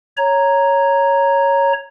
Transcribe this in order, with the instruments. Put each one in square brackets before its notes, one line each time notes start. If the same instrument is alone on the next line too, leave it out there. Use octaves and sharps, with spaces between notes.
[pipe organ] C#5 A#5